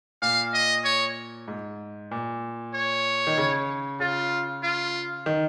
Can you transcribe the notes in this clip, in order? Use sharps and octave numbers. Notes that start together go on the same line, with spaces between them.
A#2 F5
D#5
C#5
G#2
A#2
C#5
D#3
C#3
C#3 F4
F4
D#3